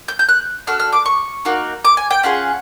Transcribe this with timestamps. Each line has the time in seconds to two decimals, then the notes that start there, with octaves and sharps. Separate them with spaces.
0.08 G6
0.19 G6
0.29 F#6
0.67 D4 F#4 A4 F6
0.80 F6
0.93 D6
1.06 C#6
1.45 A#3 D#4 F#4
1.85 D6
1.97 G#5
2.10 G5
2.23 C#4 F4 G#4 F#5